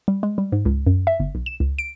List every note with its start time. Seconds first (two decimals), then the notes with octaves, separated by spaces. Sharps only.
0.08 G3
0.23 G#3
0.38 G3
0.52 G#2
0.65 C#2
0.86 F#2
1.07 E5
1.20 G1
1.35 B1
1.46 E7
1.60 C#2
1.79 D7